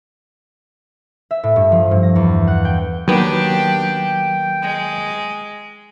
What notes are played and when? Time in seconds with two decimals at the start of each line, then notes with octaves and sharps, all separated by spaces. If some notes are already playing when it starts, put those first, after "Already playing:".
1.31 E5
1.43 A2
1.56 G2
1.72 F3
1.91 G2
2.03 A#6
2.16 E2
2.47 F#5
2.65 G5
3.08 D#2 F#3 B3 D4 G4 G5
4.62 G#3